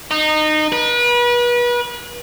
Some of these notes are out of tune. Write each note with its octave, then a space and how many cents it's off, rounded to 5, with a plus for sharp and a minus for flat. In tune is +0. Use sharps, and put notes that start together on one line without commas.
D#4 -20
B4 -35